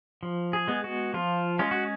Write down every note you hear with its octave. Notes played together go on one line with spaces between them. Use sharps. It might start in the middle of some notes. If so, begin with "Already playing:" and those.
F3
G#4
G#3 B3
F#4
F3 F4
G#3 C#4 F4
F#4